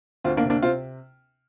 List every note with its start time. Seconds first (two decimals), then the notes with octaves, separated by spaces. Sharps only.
0.24 D2 C4 F4
0.37 A#3 D4
0.44 C3
0.50 A#3 D4
0.63 C3 C4 F4